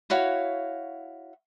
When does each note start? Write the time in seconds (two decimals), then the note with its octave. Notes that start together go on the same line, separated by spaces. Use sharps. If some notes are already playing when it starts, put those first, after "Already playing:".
0.10 E4 F#4 C#5 F5